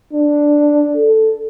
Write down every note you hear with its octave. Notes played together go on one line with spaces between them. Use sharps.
D4
A4